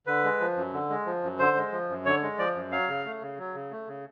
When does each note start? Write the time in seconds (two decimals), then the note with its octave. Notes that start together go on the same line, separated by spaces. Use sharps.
0.07 D3 B4
0.24 G#3
0.40 F3
0.57 F#2
0.73 D3
0.90 G#3
1.06 F3
1.23 F#2
1.39 D3 C5
1.56 G#3
1.72 F3
1.89 F#2
2.05 D3 C#5
2.23 G#3
2.39 F3 D5
2.55 F#2
2.71 F#3 F5
2.89 C#3
3.05 A3
3.21 C#3
3.38 F#3
3.55 C#3
3.71 A3
3.88 C#3